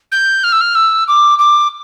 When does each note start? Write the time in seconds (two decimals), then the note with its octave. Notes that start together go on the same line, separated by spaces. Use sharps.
0.11 G6
0.43 F6
0.52 E6
0.61 F6
0.75 E6
1.07 D6
1.38 D6